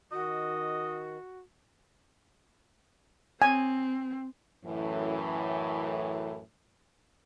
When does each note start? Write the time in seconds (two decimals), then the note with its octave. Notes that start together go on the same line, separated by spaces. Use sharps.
0.12 D#3 F#4 D#5
3.42 C4 G#5
4.65 F#2 A2 E3